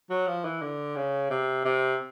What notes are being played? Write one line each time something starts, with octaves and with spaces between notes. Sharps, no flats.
F#3
F3
E3
D3
C#3
C3
C3